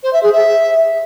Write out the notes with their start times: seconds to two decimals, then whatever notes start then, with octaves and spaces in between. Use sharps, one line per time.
0.03 C5
0.13 E5
0.23 G#4
0.33 E5